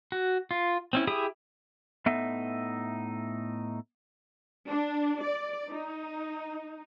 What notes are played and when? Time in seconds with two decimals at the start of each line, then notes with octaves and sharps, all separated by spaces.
0.12 F#4
0.51 F4
0.93 C4 C#4 E4
1.07 E4 G4 G#4 E5 D#6
2.06 A2 B3 D#4 A4 E5
4.69 D4
5.22 D5
5.70 D#4